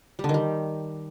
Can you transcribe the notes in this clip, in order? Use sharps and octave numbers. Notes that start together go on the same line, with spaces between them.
G3
D3
D#3
G3